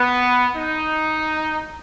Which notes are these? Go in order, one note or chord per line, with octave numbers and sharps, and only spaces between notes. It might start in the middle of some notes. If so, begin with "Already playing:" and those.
Already playing: B3
D#4